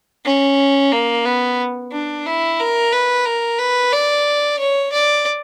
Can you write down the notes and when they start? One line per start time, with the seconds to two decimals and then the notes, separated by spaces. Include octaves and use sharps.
0.25 C#4
0.92 A#3
1.25 B3
1.92 D4
2.26 E4
2.59 A#4
2.92 B4
3.25 A#4
3.58 B4
3.92 D5
4.59 C#5
4.92 D5